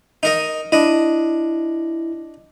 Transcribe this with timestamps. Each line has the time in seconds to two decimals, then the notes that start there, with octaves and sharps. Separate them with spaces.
0.23 D#4 A#4 D#5
0.72 D4 E4 D#5